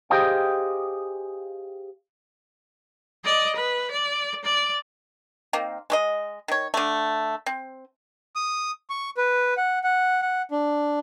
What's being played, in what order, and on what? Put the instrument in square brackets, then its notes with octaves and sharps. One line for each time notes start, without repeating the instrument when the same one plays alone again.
[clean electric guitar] G4 G#4 C5 D#5 F5 G5
[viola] D5 D#5
B4
D5
D5
[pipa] D#3 A#3 C4
G#3 F#4 D#5
D#3 C#5
D3 A3
C4
[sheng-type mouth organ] D#6
C#6
B4
F#5
F#5
F#5
D4